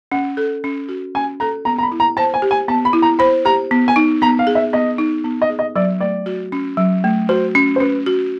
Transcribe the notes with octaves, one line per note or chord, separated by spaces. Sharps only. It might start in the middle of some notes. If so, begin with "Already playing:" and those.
C#4 F#5
A4
C#4
F#4
C#4 G#5
A4 A#5
B3 A#5
A#5
B5
E4
A#5
C5 A5
G#5
G4
G#5
B3 A5
B5
E4
A#5
C5 B5
G4 A#5
B3
G#5
D#4
B3 A#5
F5
G#4
E5
B3 D#5
D#4
B3
D#5
G#4
D#5
F#3 D5
A3 D5
F#4
C#4
F#3
A3
F#4 C5
C#4
C5
C#4 B4
F#4